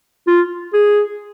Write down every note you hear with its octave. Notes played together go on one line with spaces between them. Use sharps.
F4
G#4